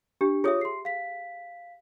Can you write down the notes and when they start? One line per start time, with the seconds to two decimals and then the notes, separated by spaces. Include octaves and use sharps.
0.21 D4 G4
0.44 F4 G#4 C#5 E5 D#6
0.61 C6 C7
0.85 F5 B6